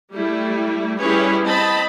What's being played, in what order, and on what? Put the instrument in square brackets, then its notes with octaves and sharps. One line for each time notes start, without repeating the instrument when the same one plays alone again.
[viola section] G3 A3 E4
G3 C#4 E4 G#4 B4 C#5
C4 D#5 A5 B5